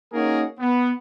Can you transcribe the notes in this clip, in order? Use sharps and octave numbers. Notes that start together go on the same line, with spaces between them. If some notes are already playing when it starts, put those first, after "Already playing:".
A#3 C#4 D#4 F#4 G#4 A#4
B3